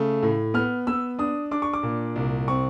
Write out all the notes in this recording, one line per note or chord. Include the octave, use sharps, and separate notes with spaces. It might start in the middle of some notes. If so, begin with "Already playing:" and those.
Already playing: C#3 A3
A2
B3 F6
B3 E6
D4 D#6
D4 D6
C#6
D6
A#2
C2
C4 C#6